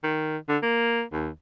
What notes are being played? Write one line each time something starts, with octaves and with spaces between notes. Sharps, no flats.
D#3
D3
A#3
D#2